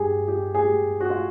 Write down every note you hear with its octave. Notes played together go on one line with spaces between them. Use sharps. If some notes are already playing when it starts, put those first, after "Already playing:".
Already playing: G2 G4 G#4
G4
G#4
G4
F#4
F4